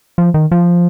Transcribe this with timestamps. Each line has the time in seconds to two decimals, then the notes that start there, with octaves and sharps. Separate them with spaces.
0.18 F3
0.34 D#3
0.52 F3